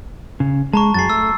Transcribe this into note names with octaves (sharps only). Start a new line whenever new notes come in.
C#3
G#3 A5 A#5 C#6
F#2 F#3 G#4 A6 C7
A3 E6